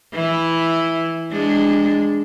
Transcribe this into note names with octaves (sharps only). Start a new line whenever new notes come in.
E3 E4
G#3 D4